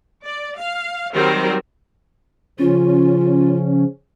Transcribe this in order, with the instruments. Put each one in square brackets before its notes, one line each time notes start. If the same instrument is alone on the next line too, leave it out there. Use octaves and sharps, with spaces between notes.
[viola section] D5
F5
D#3 F#3 G3 C4 A#4 C5
[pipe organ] C#3 F3 [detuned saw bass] C#4 [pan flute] F4